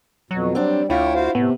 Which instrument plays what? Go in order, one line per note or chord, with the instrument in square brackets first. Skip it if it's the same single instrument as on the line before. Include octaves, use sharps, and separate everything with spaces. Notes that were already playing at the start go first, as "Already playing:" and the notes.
[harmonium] F2 B2 [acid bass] F#3
[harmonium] G3 [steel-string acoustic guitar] C4 D4
[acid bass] D2 [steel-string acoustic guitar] E4 F4 [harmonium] C#5 G5
[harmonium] F#4 C5 F5
[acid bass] A2 [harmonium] C3 [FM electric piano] B3